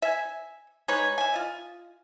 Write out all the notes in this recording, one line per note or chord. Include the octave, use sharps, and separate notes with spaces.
E5 G#5
G#3 D#4 B4 C#5
E5 G#5
F4 D#5